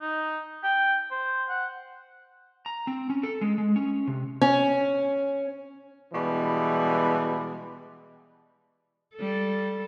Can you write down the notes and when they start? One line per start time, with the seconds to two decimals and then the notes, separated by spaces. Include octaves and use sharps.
0.01 D#4
0.63 G5
1.11 C5
1.49 F#5
2.66 A#5
2.87 C4
3.10 C#4
3.23 A4
3.41 G#3
3.58 G#3
3.76 C#4
4.07 C3
4.41 C#4
6.13 B2 E3 G3 G#3
9.16 G3 A4